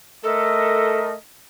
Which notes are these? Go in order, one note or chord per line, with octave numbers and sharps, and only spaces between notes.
A3 A4 A#4 D#5